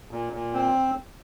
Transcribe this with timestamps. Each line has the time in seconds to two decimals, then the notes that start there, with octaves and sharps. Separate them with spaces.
0.11 A#2
0.32 A#2
0.53 C4